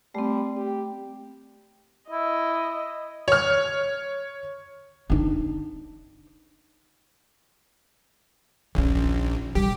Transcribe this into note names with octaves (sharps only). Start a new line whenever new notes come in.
G3 A3 C4
G4
E4 D#5
C#5 F6
D4 D#4
A#1 D#2 C#4
A#1
C3 G3 G4